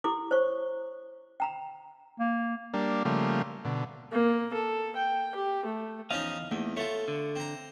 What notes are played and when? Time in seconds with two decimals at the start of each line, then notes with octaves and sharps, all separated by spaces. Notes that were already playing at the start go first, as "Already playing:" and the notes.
0.04 E4 G4 A4 C6 D6
0.31 C5 C#5 C#6
1.40 G5 A#5 B5
2.20 A#3
2.74 G3 A#3 D4
3.05 C#3 F3 G3 A3 A#3
3.65 B2 D3
4.12 A#3
4.54 A4
4.96 G5
5.35 G4
5.66 A3
6.11 E2 F3 C#4 D#4 D#5 F5
6.51 E2 A3 A#3 D#4
6.77 A3 F4 A4 C#5
7.08 D3
7.36 C4 A#5